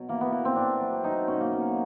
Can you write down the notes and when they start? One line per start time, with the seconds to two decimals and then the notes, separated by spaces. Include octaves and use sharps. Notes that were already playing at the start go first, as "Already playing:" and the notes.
Already playing: B2 F#3
0.09 E3 A#3
0.21 B3
0.32 E3 A#3
0.45 C4
0.56 A2 D4
0.81 F#3
1.04 F#3 D#4
1.28 B2 C#4
1.41 A#3
1.53 F#3